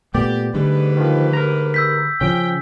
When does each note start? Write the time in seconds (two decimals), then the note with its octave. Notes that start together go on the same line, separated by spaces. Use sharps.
0.14 A#2 A3 B3 G4 D5
0.54 G#2 D3 G3 A3 G4 B4
0.97 D#3 F3
1.33 A#4 A#5
1.74 E6 G6 B6
2.21 C#3 F3 C#4 G5